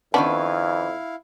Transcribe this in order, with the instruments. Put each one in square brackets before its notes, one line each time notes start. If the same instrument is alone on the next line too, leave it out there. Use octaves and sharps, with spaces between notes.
[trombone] F2 [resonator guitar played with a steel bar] D#3 C#4 B4 [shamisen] B3 D4 [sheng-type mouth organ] E4 F5